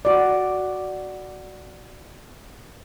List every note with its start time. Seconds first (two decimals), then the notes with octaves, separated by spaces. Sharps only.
0.05 F#4 D5